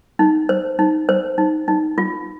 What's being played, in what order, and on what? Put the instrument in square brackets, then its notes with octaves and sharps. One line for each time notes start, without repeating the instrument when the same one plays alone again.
[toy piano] D#4
C5
D#4
C5
D#4
D#4
F4